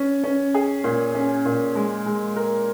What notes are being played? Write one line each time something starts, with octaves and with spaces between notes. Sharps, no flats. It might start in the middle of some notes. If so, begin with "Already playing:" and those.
Already playing: C#4
C#4
G#4
A#2
C#4
A#2
G#3
G#3
A#4